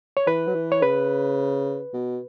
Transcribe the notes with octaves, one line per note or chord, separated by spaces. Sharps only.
C#5
E3 B4
F#3
E3
C#5
C#3 B4
B2